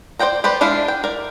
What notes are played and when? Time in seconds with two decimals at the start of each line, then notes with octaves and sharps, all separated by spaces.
0.19 C5 D5 F#5 G5 A#5
0.44 G4 B4 C5 D5
0.61 G#3 D4 E4 F5
0.88 G5
1.04 A#4 D5